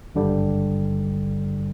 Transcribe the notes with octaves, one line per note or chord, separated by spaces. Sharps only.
G#1 G2 D3 G3